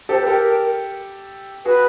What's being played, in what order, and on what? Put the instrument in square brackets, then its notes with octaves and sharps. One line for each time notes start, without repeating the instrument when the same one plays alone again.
[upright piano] G4 A4 [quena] C5
[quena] B4
[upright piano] G4 A4 [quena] A#4
[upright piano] F#4 G#4 [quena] B4